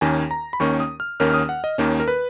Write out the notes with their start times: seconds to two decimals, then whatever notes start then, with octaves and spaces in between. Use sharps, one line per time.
0.01 D#2 D#3 A#3 C#4 G#5
0.31 A#5
0.53 B5
0.60 D#2 D#3 A#3 C#4 C#6
0.80 D#6
1.00 F6
1.20 D#2 D#3 A#3 C#4 F6
1.30 F6
1.34 D#6
1.49 F#5
1.64 D#5
1.78 D#2 D#3 A#3 C#4
2.00 A#4
2.08 B4